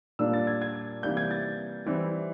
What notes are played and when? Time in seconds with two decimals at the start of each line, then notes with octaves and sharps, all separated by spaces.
0.19 A#2 G3 A#3 D4 E6
0.33 A6
0.47 G#6
0.62 G#6
1.03 C3 E3 G3 A#3 G6
1.17 G#6
1.31 A6
1.86 E3 G3 C4 E4